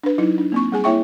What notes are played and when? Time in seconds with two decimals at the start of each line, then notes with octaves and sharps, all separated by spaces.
0.04 D4 B4
0.18 F#3 D#4 E4
0.38 D4
0.52 A#3 C4 C#6
0.72 G3 G#4 G#5
0.84 A#3 E4 C#5 E5 G5 C#6